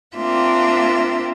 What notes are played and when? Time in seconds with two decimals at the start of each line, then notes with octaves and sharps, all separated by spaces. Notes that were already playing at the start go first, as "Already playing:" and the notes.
0.17 A#3 C4 D4 F4 E5